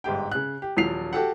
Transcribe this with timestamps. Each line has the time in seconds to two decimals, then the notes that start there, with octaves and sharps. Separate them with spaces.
0.04 G1 G#2 G4 G5
0.32 C#3 F#6
0.62 G4
0.77 D#1 F3 F#3 C7 F7
1.13 F#4 G4 A4 F#5